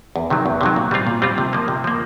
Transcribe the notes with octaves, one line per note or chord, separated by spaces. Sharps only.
E2
C3 D#3 F#3
E2
C3 D#3 F#3
A#2
G3 C4 F4
A#2
G3 C4 F4
C3
F3 A#3
C3
F3 A#3